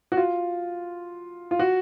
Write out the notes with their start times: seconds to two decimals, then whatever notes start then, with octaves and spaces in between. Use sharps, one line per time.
0.12 F#4
0.17 F4
1.51 F4
1.59 F#4